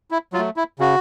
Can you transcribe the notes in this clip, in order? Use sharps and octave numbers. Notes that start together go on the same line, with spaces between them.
E4
F#3 F4
A3
E4
C#3 F#4